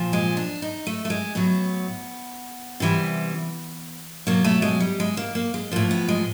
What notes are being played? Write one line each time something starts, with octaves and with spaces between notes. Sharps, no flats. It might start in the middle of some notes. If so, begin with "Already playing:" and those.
Already playing: A#2 F3
G#3
D4
D#4
A3
A3
G#3
A2 F#3 B3
C3 E3 G3
B2 F#3 A#3
A3
G#3
G3
G#3
A#3
A#3
G#3
A2 F3 A#3
B3
G#3